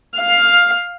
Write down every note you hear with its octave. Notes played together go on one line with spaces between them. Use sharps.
F5